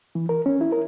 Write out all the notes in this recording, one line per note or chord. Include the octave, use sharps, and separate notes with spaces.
E3
A#4
C#4
E4
A#4